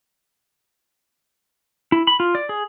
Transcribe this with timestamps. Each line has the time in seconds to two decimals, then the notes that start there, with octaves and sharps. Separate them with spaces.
1.92 E4
2.07 B5
2.20 F4
2.35 D5
2.49 G#4